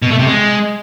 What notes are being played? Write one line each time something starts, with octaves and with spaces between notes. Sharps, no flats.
B2
A3
C3
G#3